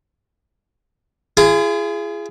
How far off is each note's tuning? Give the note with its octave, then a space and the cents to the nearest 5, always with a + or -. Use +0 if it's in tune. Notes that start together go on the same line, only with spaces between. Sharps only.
F4 -45 G#4 +0